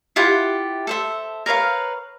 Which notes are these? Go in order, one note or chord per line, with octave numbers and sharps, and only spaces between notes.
E4 F4 G4 F#5
A4 C5 E5
A#4 B4 C#5 F5